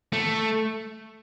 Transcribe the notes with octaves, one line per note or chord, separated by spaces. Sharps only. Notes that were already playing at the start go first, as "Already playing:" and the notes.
A3